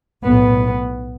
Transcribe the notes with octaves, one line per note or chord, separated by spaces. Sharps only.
B1 A2 B3